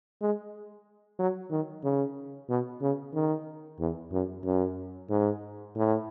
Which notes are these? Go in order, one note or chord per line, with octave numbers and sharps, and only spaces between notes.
G#3
F#3
D#3
C#3
B2
C#3
D#3
E2
F#2
F#2
G#2
A2